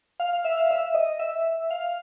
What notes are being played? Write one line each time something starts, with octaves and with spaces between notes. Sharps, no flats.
F5
F5
E5
F5
E5
D#5
E5
F5